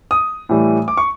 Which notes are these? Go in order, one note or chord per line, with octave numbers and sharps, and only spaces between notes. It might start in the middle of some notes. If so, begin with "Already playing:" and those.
D#6
A2 E3 G3
D6
C#6